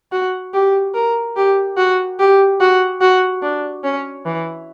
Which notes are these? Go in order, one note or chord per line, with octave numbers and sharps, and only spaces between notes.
F#4
G4
A#4
G4
F#4
G4
F#4
F#4
D4
C#4
E3